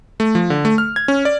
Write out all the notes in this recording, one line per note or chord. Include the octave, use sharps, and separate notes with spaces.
A3
F3
D3
A3
F6
G#6
C#4
D5